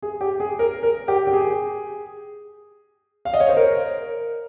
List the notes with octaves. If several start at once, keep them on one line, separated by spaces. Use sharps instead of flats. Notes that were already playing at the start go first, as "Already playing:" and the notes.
G#4
G4
G#4
A#4
A#4
G4
G4
G#4
F5
D#5
C#5
C5
A#4